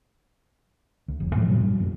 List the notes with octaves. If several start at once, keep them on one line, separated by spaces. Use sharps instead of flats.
D2
F1 C#2 C#3
A2 E3 F3 A3
G2 A#2 C#3 F#3
G2
F#2 D3 A3